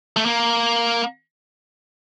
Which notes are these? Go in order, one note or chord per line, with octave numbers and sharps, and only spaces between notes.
A3
A#3